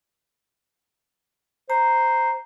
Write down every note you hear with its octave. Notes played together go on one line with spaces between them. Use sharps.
C5 A#5